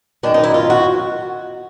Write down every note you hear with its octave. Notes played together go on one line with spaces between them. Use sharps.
F#2 D#3 D4
D#4
E4
F4
F#4